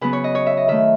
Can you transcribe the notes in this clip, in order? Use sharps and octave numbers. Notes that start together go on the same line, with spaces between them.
C#3 F#3 B3 B4
C#5
D#5
C#5
E5
D#5
D#3 A3 E5